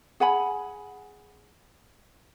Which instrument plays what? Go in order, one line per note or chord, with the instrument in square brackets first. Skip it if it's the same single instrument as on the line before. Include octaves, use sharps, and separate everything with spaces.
[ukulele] G#4 F#5 G#5 B5